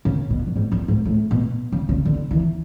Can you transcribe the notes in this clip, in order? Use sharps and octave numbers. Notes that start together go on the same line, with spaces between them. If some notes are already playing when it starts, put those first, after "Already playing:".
C#3
B2
F#2
G#2
F#2
G#2
A2
B2
C#3
C#3
D3
E3